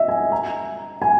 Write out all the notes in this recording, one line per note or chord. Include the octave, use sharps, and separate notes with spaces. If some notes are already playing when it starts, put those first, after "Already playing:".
Already playing: D#5 E5
G#5
A#5
G#5